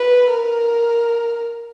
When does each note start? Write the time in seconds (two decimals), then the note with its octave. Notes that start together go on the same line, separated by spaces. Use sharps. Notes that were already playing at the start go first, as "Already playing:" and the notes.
Already playing: B4
0.30 A#4